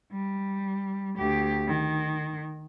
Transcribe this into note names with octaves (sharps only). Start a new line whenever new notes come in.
G3
D2 G4
D#3